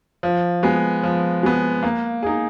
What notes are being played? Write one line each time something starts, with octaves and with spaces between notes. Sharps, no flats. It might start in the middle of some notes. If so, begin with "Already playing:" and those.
F3
G#3 B3
F3
G#3 B3
A#3
D#4 G#4